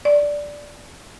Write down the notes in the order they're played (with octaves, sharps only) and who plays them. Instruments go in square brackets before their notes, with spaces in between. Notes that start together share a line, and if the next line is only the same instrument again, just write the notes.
[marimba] D5